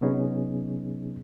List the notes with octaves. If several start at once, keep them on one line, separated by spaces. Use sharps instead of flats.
C3 F#3 B3 C#4 D#4 G#4